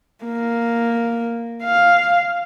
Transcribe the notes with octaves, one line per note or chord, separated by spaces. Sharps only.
A#3
F5